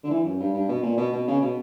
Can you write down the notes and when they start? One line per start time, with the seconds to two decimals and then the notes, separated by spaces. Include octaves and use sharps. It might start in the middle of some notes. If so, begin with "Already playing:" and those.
0.03 D3
0.10 E3
0.24 F#2
0.40 G2
0.54 G2
0.69 B2
0.83 A#2
0.97 B2
1.12 B2
1.28 C#3
1.42 B2